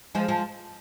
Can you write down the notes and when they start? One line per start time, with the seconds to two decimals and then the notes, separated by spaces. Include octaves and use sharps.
0.15 F3 G#3
0.28 F3 G#3